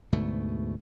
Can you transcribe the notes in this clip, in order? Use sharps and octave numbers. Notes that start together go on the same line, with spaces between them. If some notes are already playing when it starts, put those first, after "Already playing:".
D2 G#2 B2 A3